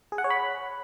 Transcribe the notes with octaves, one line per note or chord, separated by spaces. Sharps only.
G#4
F#5
C#5
B5